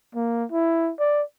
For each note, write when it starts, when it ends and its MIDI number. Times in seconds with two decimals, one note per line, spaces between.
0.15 0.44 58
0.52 0.92 64
0.99 1.22 74